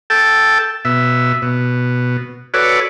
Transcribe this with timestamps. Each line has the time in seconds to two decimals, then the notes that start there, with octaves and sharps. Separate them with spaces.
0.10 A4 G5 A5
0.85 B2 E5
1.42 B2
2.54 F#4 A4 B4 C#5 D5